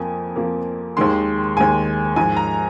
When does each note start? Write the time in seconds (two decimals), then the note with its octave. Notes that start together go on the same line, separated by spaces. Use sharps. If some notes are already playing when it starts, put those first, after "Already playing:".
Already playing: F2 F3 A#3 G#5
0.36 F2 F3 A#3
0.97 D#2 D#3 G#3 C6
1.57 D#2 D#3 G#3 G#5
2.16 G#2 F3 G#3 G#5
2.37 A#5